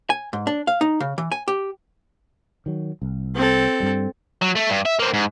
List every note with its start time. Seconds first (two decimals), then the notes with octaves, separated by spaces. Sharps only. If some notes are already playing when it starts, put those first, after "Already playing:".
0.10 G#5
0.33 G#2
0.47 D4
0.67 F5
0.81 D#4
1.00 C#3
1.18 E3
1.32 G#5
1.48 G4
2.66 D#3 F#3
3.02 C2
3.36 C4 A4
3.80 G2 G3
4.42 F#3
4.56 A3
4.70 G2
4.85 E5
4.99 A#3 C4
5.14 G#2